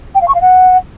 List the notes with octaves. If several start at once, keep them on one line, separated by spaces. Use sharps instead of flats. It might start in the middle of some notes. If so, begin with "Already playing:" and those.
G5
F5
C#6
F5
F#5